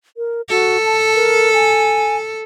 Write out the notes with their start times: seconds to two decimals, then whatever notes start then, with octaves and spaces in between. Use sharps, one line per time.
0.17 A#4
0.50 F#4 A4
0.85 A5
1.15 A#4
1.54 G#5